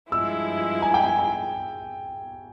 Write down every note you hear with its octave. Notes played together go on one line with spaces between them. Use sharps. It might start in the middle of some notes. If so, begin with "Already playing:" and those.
G2 F3 G#3 E4 E6
G#5
G5
G#5
G#5